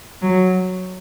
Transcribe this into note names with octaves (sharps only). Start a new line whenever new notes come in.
F#3